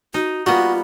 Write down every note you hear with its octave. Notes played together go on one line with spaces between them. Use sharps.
D#4 F#4
G3 A#3 B3 F4 F#4